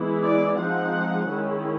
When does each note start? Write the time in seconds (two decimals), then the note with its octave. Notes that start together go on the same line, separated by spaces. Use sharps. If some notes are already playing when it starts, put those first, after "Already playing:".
Already playing: E3 G#3 B3 E4
0.23 D5
0.58 F3 G#3 C4 D#4 F#5
1.29 D#3 G#3 C#4 E4